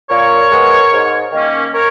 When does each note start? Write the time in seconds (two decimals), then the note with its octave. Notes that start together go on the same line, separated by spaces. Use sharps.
0.10 A#2 A#4 C#5
0.51 G#3 B3
0.92 G#2
1.33 D#3 A#3 C#4
1.73 A#4 C#5